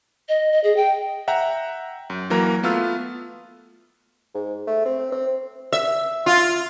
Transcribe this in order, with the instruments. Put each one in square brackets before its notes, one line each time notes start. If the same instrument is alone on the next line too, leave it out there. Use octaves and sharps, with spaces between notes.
[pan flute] D#5
D#5
G#4
G5
[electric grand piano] E5 F#5 G5 A#5
F#2
E3 F#3 A#3 A#4 A#5
A3 B3 F4 E6 F6
[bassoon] G#2
A3
C4
C4
[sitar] E5
F4